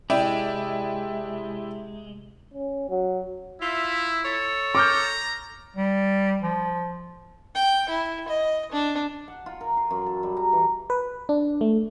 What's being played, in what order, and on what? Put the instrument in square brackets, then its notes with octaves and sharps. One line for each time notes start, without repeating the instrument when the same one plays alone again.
[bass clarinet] C3 [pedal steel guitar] G#3 [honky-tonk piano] E4 D5 G5
[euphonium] C#4
F#3
[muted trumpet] E4 [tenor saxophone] F4 [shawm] E5
[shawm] A4 [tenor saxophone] C#5
[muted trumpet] A#5 [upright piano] D6 F6 G6
[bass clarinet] G3
F3
[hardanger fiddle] G5
E4
D#5
D4
[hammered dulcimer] F#5
F4
A#4
C6
F#2
A4
G3
A#5
E3
[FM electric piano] B4
D4
A3